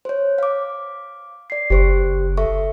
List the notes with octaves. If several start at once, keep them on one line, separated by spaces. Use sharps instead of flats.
C5 C#5
F5 D6
D5 C7
F#1 G4 C5 C#6
A4 E5 C#6